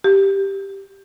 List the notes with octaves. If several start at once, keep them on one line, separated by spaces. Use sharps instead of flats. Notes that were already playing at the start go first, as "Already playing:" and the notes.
G4